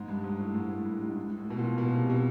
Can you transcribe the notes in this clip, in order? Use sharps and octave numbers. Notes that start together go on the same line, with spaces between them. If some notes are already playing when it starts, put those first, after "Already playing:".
Already playing: G#2
G2
G#2
A2
G#2
A2
G2
G#2
G#2
A2
B2
A#2
B2
C3
B2